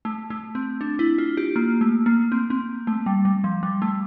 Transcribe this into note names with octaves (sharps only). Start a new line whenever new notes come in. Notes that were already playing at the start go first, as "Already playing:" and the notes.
A3
A3
C4
D4
E4
F4
G4
A#3
A3
A#3
C4
C4
A3
G3
G3
F3
G3
A3